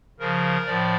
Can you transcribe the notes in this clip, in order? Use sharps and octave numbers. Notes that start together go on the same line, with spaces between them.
C#3 F3 A#4
A2 F3 D5